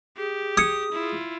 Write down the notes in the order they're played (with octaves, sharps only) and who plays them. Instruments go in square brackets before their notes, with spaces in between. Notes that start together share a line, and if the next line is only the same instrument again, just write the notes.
[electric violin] G4 [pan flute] G#4
[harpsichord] D#6 [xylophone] G#6 C#7
[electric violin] E4 F4